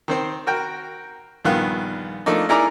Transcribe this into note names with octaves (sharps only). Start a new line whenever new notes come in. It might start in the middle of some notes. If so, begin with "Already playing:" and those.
D#3 C4 C5
F#4 A#4 G5
A#1 G2 D#3 B3 F4 F#6
F3 A3 A#3 D4 D#4
D#4 E4 G#4 A#4 D5 A#5